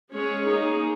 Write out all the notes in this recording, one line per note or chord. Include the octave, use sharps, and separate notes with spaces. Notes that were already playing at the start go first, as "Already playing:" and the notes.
G#3 C#4 G#4 C#5
A#3 D#4 G#4